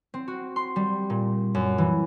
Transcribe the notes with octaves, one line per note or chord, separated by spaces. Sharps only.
C4
F#4
C6
G3
A#2
F#2
E3